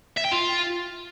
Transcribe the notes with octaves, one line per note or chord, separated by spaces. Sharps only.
E5
G5
F4